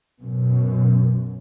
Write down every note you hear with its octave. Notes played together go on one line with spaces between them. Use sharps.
F#2 B2